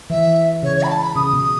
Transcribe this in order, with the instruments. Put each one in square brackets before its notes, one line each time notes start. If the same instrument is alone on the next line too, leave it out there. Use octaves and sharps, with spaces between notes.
[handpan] E3 [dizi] E5
[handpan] C#3 [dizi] C#5
[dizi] C#5
B5
A5
B5
[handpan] C#3 [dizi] D#6
[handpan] B2